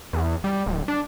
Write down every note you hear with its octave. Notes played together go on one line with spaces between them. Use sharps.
E2
G3
D1
D4